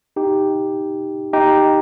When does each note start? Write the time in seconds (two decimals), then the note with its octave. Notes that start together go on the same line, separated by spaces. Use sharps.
0.16 D#4 G4
1.33 D#4 G4